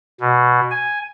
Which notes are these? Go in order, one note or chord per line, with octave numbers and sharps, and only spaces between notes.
B2
G#5